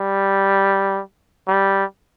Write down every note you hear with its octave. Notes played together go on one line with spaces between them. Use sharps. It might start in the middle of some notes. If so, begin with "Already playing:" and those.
Already playing: G3
G3